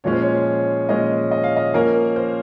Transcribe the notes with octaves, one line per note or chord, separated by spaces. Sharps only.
A#2 F3 G#3 C#4 C#5
C5
C#5
A#2 F3 G#3 C#4 D#5
D#5
F5
D#5
F3 A#3 C#4 A#4
C5